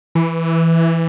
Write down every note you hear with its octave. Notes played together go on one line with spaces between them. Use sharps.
E3